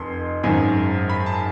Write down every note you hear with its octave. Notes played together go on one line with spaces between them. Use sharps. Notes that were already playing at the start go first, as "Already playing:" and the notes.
Already playing: F1 F2 C6
G#1 F#2 D#3
B5
A5